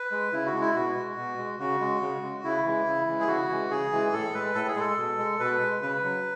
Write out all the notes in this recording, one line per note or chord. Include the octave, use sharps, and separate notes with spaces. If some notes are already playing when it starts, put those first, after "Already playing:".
Already playing: B4
G#3
C#3 E4
F#4
G#3
E4
B2 F#4
G#3
B2
G#3
C#3 F#4
G#3
C#3
G#3
C#3 E4
E3 G#3
C#3
E3 G#3
G#4
C#3 F#4
E3 G#3
C#3 G#4
E3 G#3
A2 A4
G#3 B4
A2 A4
G#4
G#3 A4
B2
G#3
B2 B4
G#3
C#3 B4
F#3